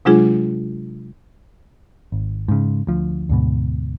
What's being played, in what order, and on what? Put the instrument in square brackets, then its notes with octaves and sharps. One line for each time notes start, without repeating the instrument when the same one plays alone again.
[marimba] C3 F#3 G#3 D4 F4 G#4
[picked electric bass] G#1
G#2 C#3
D2 F3
D2 G#2 B2